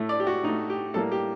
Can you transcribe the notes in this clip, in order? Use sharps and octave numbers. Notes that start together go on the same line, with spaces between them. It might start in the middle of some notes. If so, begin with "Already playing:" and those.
Already playing: A2 A3
D5
G4
F#4
A2 A3 D#4
G4
A2 G3 A#3 A4
G4